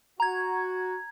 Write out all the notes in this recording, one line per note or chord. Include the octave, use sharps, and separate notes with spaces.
F#4 A#5 G#6